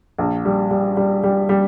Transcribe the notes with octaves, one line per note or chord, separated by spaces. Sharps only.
A#1
G3
G3
G3
G3
G3